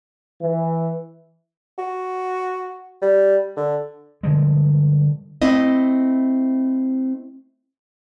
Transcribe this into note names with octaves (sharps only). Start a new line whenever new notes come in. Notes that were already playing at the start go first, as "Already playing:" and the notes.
E3
F#4
G3
D3
D3 F3 G3 G#3
A3 C4 E4 D#5